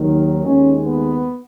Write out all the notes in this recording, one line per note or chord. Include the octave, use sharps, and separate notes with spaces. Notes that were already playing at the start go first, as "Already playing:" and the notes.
Already playing: D#2 D#3 F#3
D#2 D#3 G#3 C#4
B3